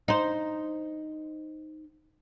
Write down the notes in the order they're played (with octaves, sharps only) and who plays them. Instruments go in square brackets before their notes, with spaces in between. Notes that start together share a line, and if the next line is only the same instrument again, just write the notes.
[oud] D#4 C5